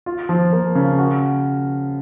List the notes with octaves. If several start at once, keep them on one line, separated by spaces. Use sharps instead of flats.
F4
F3
A#3
C#3
F#4